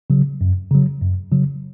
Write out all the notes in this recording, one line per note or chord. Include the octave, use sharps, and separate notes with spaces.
C#3 F#3
F#2
C#3 F#3
F#2
C#3 F#3